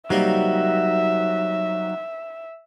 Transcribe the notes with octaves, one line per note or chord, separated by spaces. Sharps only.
C3 F#3 G3 A#3 D#4 E5